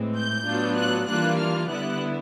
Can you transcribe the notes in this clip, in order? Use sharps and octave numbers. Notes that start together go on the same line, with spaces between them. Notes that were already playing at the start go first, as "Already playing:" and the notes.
Already playing: A2 E3 G#3 C4
G6
A2 F#3 B3 D4 F4
F#6
E3 G3 A#3 D4 F4 F#6
F6
D3 G3 B3 E4 F#6